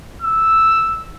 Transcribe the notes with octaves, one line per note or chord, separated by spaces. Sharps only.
E6